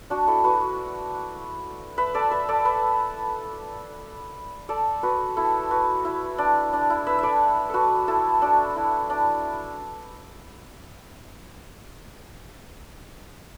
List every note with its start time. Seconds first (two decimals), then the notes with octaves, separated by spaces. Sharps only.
0.10 D4 F#4
0.28 E4 A4
0.44 F#4 B4
1.98 B4 E5
2.14 A4 D5
2.31 B4 E5
2.48 A4 D5
2.65 B4 E5
4.69 A4 D5
5.03 F#4 B4
5.37 E4 A4
5.71 F#4 B4
6.05 E4
6.38 D4
6.73 D4
6.90 E4
7.06 B4 E5
7.18 A4 D5 E5
7.70 F#4 A4 B4
8.08 E4 A4
8.42 D4 F#4
8.76 E4
9.10 D4